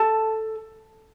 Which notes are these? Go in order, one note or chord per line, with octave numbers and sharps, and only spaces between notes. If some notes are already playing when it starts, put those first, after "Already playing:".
Already playing: A4 A5